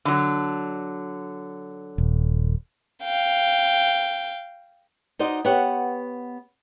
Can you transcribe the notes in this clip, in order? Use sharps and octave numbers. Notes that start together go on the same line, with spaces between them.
D3 F#3
D#1
F5 G5
D#4 F#4 C5 D5 D#5
B3 G4 C#5 F#5